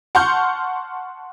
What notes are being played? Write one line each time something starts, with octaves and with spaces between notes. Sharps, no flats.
F#5 A5 C6 C#6 F6 G6